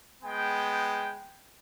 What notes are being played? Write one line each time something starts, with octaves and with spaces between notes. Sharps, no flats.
G#3 B3 G5